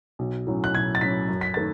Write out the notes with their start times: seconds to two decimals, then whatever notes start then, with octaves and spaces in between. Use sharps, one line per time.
0.19 B1
0.47 A2 F#3 C#4
0.64 F#6
0.74 B1 G#6
0.95 A6
1.01 A2 F#3 C#4 B6
1.28 F#2
1.41 B6
1.54 D#3 A3 A6